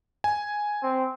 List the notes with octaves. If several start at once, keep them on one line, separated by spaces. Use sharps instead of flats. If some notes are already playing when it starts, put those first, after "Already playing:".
G#5
C4